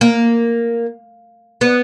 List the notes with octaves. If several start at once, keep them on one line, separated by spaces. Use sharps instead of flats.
A#3
B3